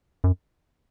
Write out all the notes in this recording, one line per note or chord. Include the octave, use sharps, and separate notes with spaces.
F#2